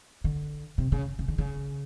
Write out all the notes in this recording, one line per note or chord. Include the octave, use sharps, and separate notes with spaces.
D3
C3
C#3
C#3
D3
C#3